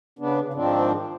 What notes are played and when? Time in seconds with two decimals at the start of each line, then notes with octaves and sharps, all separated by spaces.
0.19 C#3 B3 D4
0.41 C#3
0.54 G#2 D#3 F3 C4 D4